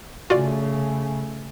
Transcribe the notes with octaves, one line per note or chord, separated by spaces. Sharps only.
C#3 A3 F4 F#4 D5